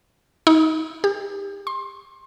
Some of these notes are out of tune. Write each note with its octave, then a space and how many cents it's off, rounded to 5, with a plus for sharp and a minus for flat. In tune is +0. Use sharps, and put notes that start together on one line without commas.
D#4 +30
G4 +30
C6 +25